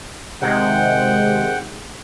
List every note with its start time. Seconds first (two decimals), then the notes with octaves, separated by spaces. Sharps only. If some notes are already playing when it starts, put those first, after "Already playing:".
0.42 C3 D#3 G#3 F#5 G5